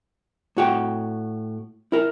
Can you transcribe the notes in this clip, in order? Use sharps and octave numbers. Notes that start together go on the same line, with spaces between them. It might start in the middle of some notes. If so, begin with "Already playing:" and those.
A2 F#4 G5
E4 A#4